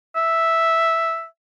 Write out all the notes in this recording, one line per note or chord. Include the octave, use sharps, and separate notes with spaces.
E5